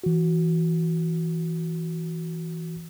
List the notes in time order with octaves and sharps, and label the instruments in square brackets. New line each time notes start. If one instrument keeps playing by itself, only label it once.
[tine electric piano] E3 F#4